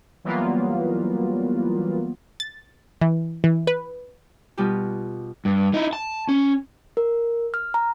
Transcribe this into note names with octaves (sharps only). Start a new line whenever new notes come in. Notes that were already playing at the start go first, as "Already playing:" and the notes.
E3 F#3 G3 A#3 B3 F4
A6
E3
E3
B4
B2 G3 F4 G4
G2
D#4 E4
A5
C#4
A#4
F6
A#5